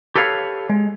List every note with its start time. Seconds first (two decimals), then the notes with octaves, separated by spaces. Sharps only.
0.16 G4 A4 B4 C#5 F5
0.69 G#3